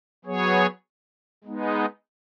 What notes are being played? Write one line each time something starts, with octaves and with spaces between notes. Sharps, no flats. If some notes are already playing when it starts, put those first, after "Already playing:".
F#3 B3 G#4 C#5
G#3 B3 D#4